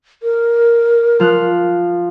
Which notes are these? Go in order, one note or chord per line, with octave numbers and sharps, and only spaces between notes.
A#4
F3 F6 F#6